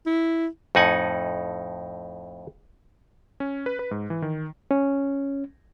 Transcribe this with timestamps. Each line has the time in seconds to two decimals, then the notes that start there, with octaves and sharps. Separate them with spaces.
0.06 E4
0.75 F2 A2 D#4 F#5 G#5
3.40 C#4
3.66 B4
3.79 B4
3.91 G#2
4.10 E3
4.22 D#3
4.71 C#4